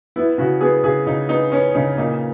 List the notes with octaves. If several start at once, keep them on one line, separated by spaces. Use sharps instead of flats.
B3 E4
C#3 F#4
B3 G#4
C#3 G#4
C#3 D#4
B3 D#4
B3 C#4
C#3 D#4
A#2 D#4